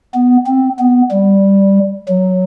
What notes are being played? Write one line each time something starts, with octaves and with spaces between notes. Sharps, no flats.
B3
C4
B3
G3
F#3